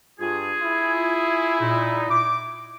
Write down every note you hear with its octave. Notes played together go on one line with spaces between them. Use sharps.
G2 F4 G#4
E4
A#2 D#4
D6